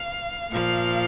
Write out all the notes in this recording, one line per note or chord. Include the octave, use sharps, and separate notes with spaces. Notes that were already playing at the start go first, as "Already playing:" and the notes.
Already playing: F5
A#2 F3 F5